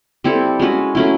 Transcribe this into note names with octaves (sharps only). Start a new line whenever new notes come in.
G3 C4 E4 A4
G#3 C#4 F#4 B4
F#3 A3 C#4 E4